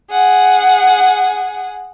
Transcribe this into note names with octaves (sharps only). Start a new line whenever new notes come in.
G#4 F#5